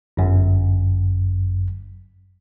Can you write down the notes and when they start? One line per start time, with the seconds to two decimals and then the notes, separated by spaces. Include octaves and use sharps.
0.17 G1 F#2